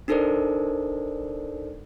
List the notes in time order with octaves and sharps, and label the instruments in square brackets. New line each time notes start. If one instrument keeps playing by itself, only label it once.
[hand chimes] D4 D#4 A4 A#4 C5 D5